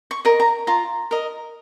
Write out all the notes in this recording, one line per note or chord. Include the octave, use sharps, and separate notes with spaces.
C#6
A#4 D#5
A#5
F4 A#5
A#4 D#5